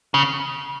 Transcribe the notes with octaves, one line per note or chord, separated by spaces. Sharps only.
C#3